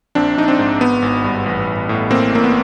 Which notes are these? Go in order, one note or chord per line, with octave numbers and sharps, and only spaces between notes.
A#1 C4 D4
A#1 D#4
C4 D4
G#2
G#1 B3
G#1
G2
A1
A1
A2
A1 A#3 C4
A1 A#3
B3